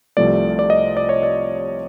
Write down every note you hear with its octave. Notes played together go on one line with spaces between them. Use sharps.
C2 C3 F3 A3 D5
D5
D#5
D5
C#5
D5